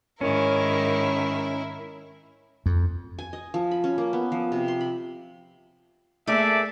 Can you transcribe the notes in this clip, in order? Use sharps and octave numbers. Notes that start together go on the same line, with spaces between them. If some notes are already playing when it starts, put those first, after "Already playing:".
G#2 D#3 C#4 E4 A#4
F2
G#5
D#5
F3
B5
C#4
A#3
B3
F3
C3
C6
B5
A3 A#3 G#4 A4 D5 E5